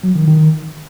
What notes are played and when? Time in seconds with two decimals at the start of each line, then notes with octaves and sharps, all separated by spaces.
0.03 F#3
0.15 D#3
0.27 D#3